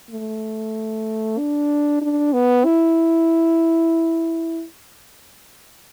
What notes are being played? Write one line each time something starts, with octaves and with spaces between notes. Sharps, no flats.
A3
D4
D4
B3
E4